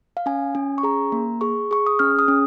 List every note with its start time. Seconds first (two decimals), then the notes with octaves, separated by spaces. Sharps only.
0.17 F5
0.26 C#4 G#5
0.55 C#4
0.78 C#6
0.83 G#4 A#5
1.12 A#3
1.41 G#4 C#6
1.71 G#4 C#6
1.86 D#6
1.99 C#4 F6
2.19 D#6
2.28 C#4